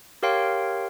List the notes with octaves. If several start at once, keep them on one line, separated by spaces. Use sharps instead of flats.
G4 A#4 C#5 F5 G5 C6